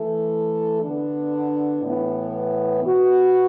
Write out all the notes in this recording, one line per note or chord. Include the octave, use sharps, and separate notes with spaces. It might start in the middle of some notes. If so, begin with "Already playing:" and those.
Already playing: E3 A3 E4 A4
D3 B3 D4
A2 E3 B3 E4
B2 B3 F#4